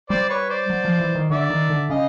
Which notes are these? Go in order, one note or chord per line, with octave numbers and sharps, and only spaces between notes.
G3 C5 D5
B4 C#5
C5 D5
F#3
F3
E3
D#3
D3 D5 E5
D#3
D3
C#3 D#5 F5